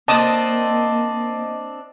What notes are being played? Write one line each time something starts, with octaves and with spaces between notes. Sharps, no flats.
A#3 C4 D4 D#5 A5 D#6